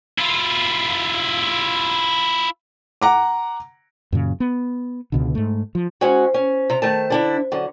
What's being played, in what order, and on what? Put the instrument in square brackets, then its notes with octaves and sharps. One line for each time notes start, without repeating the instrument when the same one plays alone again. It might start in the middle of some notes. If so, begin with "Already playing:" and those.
[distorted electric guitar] E4 F4
[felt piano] F#5 A#5 D6
[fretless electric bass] F#2 A#2 C#3
B3
C#2 B2 D3
G#2 A3
F3
[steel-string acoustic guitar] G#3 C#4 F#4 [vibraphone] C5
[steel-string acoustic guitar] C#4
C3 A#5
D#3 A3 A5
D3 D4 E4
D3 F#3